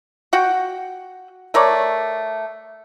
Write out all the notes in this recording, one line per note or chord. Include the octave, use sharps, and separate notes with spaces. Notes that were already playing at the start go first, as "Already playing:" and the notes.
F#4 F#5 G5
A3 A#4 C#5 D5